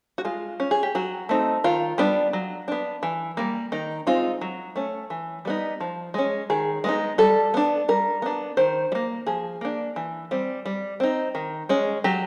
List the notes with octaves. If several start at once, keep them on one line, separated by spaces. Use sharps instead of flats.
F#4
G#3 F4
C#4
G#4
G4
F#3 F#4
A3 C4 D#4
D#3 F4
G3 B3 D4
F#3
B3 D4
E3
G3 A#3
D#3 D#4
G#3 C4 D#4 F4
F#3
A3 C#4
E3
G3 B3 D#4
F3
G#3 C#4
D#3 G#4
G#3 B3 D#4
G3 A4
B3 D4
G3 A#4
B3 D4
D#3 C5
G3
A#3
F3 G#4
A#3 D4
E3
G3 C4
G3
C4 D#4
D#3
G#3 C#4
F#3 G4